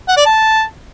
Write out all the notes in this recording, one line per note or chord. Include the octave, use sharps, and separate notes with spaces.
F#5
D5
A5